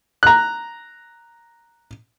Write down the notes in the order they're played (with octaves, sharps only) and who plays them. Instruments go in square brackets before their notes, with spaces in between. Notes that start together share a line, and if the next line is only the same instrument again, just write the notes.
[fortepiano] A#5 F#6